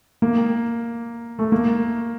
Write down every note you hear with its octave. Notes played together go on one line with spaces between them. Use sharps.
A#3
A3
A#3